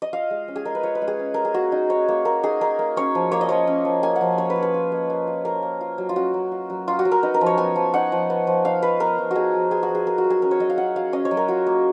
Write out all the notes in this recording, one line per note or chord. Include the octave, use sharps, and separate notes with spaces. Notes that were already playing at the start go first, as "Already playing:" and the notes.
D#5
F4 F5
G#3
C#4
G#4
G#3 A#4
B4
F4 C#5
B4
G#3
G#4
C#4
G#3 A#4
G#4
A#3 F#4
D#4
D#4 C#5
A#3
A#3 A#4
D#4 G#4
D#4 A#4
A#3
C#4 C#5
F3
A#3 C#5
D#5
F3 C#5
C#4
F3
A#3 G#5
F#5
F3
A#3 C#5
B4
F4
B4
F4
A#3
A#3
F4
F4 A#4
A#3
F4
F#3
F4
C#4 F#4
F#3
F4
F#3
C#4 F4
F#4
F#3
A#4
D#4 B4
A#4
F3
C#5
B3 G#5
F3
D#4 F#5
F3
B3
F3
D#4 F5
F3 B4
B3 A#4
F3
D#4 F#4 G#4
F3
B3 G#4
F#4
F3
G#4
F4 A#4
F#4
F#3
G#4
C#4 A#4
C#5
F#3 D#5
F5
F4 F#5
F#3 F5
C#4 D#5
C#5
F#3
A#4
F4 F#4
A#3